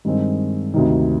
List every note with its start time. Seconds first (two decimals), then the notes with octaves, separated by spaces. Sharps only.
0.05 G2 D#3 G#3 C4
0.74 D2 C3 D#3